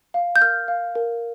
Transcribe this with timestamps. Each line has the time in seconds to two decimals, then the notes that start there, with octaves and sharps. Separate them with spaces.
0.14 F5
0.36 G6
0.41 A#4 F6
0.68 F5
0.95 A#4